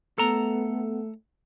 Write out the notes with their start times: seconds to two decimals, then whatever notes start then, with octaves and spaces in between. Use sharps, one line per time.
0.18 A3 B3 A4 A#5